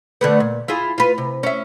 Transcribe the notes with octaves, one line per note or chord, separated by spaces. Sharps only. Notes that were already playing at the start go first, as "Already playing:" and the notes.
D3 A3 B3
A#2
E4 F4 G#4
F4 B4
C3
C#4 E5